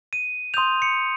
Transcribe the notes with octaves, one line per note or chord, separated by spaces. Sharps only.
D#7
C6 D#6 G6 F7
C#7